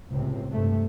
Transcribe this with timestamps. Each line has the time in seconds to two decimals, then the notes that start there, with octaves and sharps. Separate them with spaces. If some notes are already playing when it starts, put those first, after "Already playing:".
0.10 C#2 A2 C3 C4
0.49 G2 C3 A3